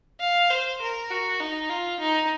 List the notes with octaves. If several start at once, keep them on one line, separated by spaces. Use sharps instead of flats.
F5
C5
A#4
F#4
D#4
F4
D#4